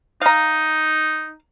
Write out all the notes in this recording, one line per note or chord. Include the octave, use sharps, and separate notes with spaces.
D#4 F5 A#5